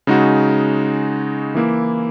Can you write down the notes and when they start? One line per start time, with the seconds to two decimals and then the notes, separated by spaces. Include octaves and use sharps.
0.07 C#3 G#3 D#4 F#4
1.55 E3 A#3 E4